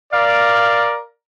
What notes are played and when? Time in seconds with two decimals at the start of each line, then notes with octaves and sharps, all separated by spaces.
0.13 A#4 D5 F5